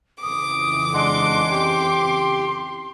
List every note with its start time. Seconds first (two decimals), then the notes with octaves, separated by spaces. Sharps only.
0.22 F2 C#3 E3 D6 D#6
0.94 G#3 D4 F#5 C6
1.51 G4